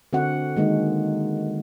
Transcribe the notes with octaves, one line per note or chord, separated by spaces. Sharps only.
D3 C4 F#4 F#5
D#3 G#3 A#3 D#4